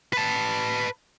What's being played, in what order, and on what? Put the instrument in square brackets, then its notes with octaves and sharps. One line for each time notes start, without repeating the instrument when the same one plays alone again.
[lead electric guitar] B4 A5